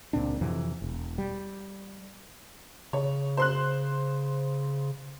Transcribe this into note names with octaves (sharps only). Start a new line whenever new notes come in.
C#2 A#2 C4 D4
F2 C3 E3
E1
G3
C#3 C#5
C5 C6 F#6